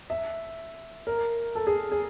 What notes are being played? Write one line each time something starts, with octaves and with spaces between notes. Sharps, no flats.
E5
A#4
A4
G#4
G#4